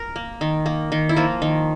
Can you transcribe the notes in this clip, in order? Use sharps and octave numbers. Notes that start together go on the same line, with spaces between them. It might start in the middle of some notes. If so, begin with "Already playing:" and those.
Already playing: A#4
A#3
D#3
A#3
D#3
E4
F3 A#3 F4
D#3